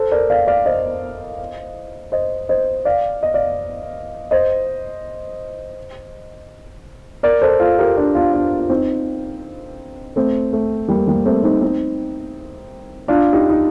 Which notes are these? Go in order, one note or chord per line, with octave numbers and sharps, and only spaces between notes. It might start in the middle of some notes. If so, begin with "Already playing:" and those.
Already playing: A4 C5
A#4 D5
D5 F5
D5 F5
C5 D#5
C5 D#5
C5 D#5
D5 F5
D#5
D5 F5
C5 D#5
A#4 D5
A4 C5
F4 A4
G4 A#4
D4 F4
D4 F4
D4 F4
F4
C4 D#4
A3 C4
A3
G3 A#3
G3 A#3
A3 C4
C4 D#4
C4 D#4
D4 F4
D#4 G4
D#4